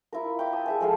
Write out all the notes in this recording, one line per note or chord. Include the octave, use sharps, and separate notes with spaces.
E4 F4 A#4
G5 B5 D6
A5 D#6
G#4 E5 G#5
F3 G#3 A4 F5